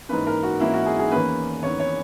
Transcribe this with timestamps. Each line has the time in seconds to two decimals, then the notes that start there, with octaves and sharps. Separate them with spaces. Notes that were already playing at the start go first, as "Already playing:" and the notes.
0.09 G#2 E3 A#3 C#4 B4
0.27 A#4
0.43 F#4
0.60 G#2 E3 A#3 C#4 E4
0.73 F#4
0.86 G#4
0.99 G#4
1.12 E2 D#3 A#3 C#4 B4
1.63 E2 D#3 A#3 C#4 C#5
1.80 C#5